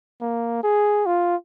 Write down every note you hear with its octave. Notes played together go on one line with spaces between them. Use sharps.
A#3
G#4
F4